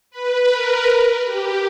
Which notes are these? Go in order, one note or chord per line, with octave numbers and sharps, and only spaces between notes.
B4
A#4
G4